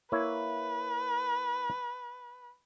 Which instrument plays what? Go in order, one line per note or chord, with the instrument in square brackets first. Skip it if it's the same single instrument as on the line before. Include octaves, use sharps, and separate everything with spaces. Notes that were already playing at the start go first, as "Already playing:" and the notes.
[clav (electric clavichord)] A#3 E4 C#5 [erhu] B4